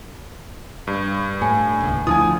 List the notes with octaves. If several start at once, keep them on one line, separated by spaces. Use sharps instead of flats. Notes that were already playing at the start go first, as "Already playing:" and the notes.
G2
A2 G#5
D#1 C#2
D2 F3 E4 G#5 D#6